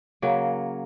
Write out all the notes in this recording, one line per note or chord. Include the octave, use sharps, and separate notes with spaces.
C#3 F#3 A#3